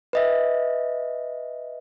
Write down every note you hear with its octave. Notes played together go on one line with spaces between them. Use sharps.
B4 D#5 E5